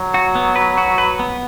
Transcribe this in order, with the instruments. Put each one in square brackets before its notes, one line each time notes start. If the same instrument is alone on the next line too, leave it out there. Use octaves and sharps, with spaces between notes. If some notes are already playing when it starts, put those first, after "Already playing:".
Already playing: [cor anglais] F#3
[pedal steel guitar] F#4
B3
B4
F#4
B4
B3